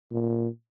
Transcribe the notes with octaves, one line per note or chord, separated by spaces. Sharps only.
A#2